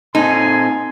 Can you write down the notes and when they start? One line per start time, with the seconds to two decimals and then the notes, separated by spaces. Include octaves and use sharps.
0.15 A#2 C4 D#4 A4 G#5 C6